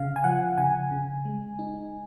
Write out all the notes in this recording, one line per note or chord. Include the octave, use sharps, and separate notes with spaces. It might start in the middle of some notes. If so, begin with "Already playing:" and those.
Already playing: C#3 F5
G#5
F3 F#5
C#3 G#5
C#3
G#3
D#4